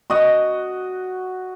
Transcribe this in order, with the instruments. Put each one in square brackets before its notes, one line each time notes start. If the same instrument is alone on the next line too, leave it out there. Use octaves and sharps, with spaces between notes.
[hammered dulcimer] F#4 D#5